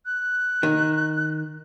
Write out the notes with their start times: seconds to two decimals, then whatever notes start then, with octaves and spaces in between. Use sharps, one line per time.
0.06 F#6
0.63 D#3